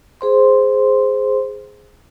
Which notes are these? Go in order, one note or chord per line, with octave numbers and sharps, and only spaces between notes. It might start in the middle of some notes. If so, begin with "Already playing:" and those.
G#4 C5 C6